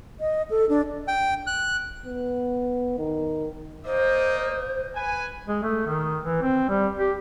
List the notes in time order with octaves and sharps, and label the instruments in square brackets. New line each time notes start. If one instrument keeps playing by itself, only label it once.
[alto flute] D#5
A4
D4
[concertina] G5
F#6
[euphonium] B3
D#3
[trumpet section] A#3 D5 D#5 [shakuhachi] C5
[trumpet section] B4 G#5
[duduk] G#3
A3
D#3
E3
C4
G3
G4